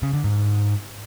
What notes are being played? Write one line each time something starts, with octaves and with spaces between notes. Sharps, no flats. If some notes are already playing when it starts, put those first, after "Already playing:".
C#3
D3
G#2